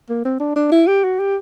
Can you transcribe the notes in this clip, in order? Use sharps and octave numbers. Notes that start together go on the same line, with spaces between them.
A#3
C4
D4
D4
E4
G4
F#4
G4